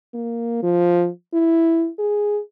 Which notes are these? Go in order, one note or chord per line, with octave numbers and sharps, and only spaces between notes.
A#3
F3
E4
G#4